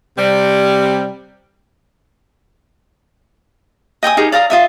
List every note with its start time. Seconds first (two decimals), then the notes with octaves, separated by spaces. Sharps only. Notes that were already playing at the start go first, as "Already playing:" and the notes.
0.17 C3 G3
4.03 D#5 G5 G#5 D#6
4.17 D#4 G4 G#4 A#4
4.32 D5 F5 A#5 D#6
4.50 F4 D#5 E5